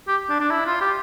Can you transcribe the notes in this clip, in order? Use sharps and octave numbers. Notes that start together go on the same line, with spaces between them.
G4
D4
D4
E4
F4
G4